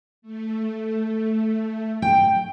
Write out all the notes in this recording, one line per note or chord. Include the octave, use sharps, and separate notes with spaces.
A3
G5